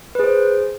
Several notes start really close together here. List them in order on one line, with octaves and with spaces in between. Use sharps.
B4 G#4 C5